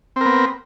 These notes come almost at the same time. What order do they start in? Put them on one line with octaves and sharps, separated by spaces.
C4 A#4 B3